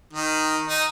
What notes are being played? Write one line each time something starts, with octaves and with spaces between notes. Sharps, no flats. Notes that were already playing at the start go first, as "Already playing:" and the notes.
D#3
D#4